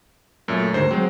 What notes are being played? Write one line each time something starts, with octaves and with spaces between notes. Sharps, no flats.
F#2 A#2 A3 E5
D2 G#2 D#3 C5
F#3 G#3 C4